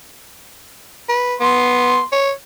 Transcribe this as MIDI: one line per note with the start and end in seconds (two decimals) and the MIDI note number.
1.09 1.35 71
1.40 2.00 59
1.40 2.03 84
2.12 2.32 73